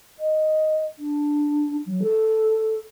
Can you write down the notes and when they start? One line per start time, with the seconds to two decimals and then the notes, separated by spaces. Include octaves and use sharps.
0.19 D#5
0.99 D4
1.86 F#3
2.02 A4